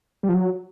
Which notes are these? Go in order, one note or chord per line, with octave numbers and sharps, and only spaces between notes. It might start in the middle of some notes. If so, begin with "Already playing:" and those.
G3
F3
F#3